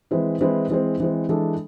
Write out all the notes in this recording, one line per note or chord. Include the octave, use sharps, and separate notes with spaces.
E3 G#3 C4 E4 B4
E3 G#3 C4 E4 B4
E3 G#3 C4
E3 G#3 C4
E3 G#3 D4 A4